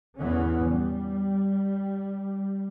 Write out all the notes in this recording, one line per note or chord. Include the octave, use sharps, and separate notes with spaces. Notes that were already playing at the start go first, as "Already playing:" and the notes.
E2 A2 E3 B3 C#4
G3